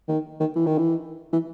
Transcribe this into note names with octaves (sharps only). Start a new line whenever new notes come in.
D#3
D#3
E3
D#3
E3
E3